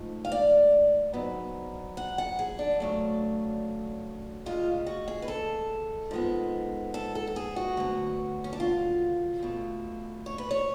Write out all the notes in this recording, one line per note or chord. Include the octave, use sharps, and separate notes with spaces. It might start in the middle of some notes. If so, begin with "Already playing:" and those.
Already playing: G#2 F3 A3
F5
D5
G#2 F#3 B3
F#5
F#5
G#4
D4
D2 C#3 F#3 A3
D2 C#3 G#3 F4
F#4
G#4
B4
A4
G#2 F3 G#3 B3
A4
A4
A4
G#4
F#4
D2 D3 F#3 B3
C#4
D4
F4
B2 A3
C#5
B4
C#5